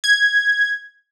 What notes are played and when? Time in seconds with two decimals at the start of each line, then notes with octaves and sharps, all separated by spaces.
0.04 G#6